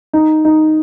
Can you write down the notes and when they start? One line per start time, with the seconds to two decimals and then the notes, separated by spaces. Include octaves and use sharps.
0.13 D#4
0.45 D#4